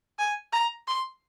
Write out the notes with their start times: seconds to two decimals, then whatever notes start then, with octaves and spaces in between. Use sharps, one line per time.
0.19 G#5
0.52 A#5
0.88 C6